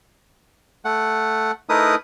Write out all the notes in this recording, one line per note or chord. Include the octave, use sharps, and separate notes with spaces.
A3 F#5
A3 D#4 E4 A#4 B4 D#6